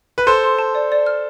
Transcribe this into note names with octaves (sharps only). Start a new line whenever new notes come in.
B4
A4 C5 C6
C6
A5
D5
D5
F6